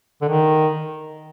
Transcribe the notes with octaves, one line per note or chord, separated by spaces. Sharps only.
D3
D#3